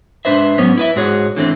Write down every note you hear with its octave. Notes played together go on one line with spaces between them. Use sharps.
G#2 D4 B4 C5 E5
G#2 F#3 B3 C#4
E4 B4 E5
G#2 F#4 G#4 C#5
D3 E3 A3 C4